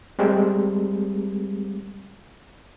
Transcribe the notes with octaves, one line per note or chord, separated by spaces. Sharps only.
G3 G#3 C4